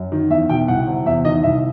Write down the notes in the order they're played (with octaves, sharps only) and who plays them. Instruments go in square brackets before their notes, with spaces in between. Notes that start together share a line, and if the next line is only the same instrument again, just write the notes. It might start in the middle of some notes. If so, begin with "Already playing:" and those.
Already playing: [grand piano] F#2
D#3
E2 E5
B2 G5
C2 F#5
C3
E2 E5
D#3 D#5
C2 E5